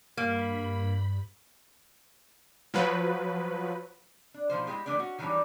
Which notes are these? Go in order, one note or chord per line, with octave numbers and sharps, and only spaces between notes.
G2 A#3 B5
F3 F#3 B4
D4
B2 D#3 F3 C5
G#3 E4 F4 G4 G#4
D3 E3 A3 D4 G#4 D5
C#4 F#4
D#3 E3 F#3 G3 C#4 D4